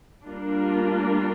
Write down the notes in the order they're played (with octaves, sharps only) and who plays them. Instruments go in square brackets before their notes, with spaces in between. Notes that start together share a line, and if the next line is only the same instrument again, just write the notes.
[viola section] G3 A#3 D4 F4 A#4